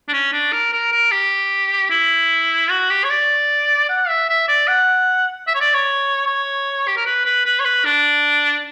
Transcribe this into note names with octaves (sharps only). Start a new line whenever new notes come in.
D4
C#4
D4
A#4
A#4
A#4
G4
E4
F#4
G4
C#5
D5
F#5
E5
E5
D5
F#5
E5
C#5
D5
C#5
C#5
G4
A#4
B4
B4
B4
C#5
B4
D4